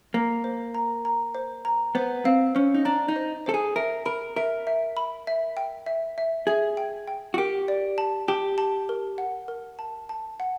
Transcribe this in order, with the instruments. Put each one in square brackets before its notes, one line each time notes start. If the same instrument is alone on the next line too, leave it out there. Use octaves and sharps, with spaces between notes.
[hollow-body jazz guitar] A#3 [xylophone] A#5
[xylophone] C5
A#5
A#5
C5
A#5
[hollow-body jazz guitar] B3 [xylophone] C5
[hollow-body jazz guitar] C4 [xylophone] F5
[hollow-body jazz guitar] C#4 [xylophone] C5
[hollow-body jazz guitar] D#4
[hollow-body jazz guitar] D4 [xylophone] A#5
[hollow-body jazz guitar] D#4
[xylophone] C5
[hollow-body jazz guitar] A4 [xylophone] C5
[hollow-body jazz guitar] G#4
[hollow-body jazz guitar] A#4 [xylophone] E5
[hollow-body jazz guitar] A#4 [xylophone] B5
[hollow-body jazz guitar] A#4 [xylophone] E5
[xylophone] E5
B5
E5
G5
E5
E5
[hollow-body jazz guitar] G#4 [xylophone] E5
[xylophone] G5
G5
[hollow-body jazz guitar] F#4
[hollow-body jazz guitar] G4 [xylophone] A#4
[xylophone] D5
A5
[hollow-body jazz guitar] G4 [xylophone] A5
[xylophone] A5
A#4
F#5
A#4
A5
A5
F#5